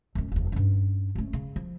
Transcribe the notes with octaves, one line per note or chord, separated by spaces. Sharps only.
F#2 C#4
F1 E2
G2 C#4
A3 C#4
C#3
F3